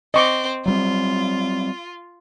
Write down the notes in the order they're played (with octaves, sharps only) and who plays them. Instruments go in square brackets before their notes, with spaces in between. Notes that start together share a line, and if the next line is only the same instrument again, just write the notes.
[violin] C4 [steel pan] D#5 C#6 D6
[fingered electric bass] F#3 G3 C4 [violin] F4